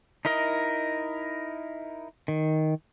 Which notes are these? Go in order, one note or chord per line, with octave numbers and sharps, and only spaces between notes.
D#4 E4 A#4 D#5
D#3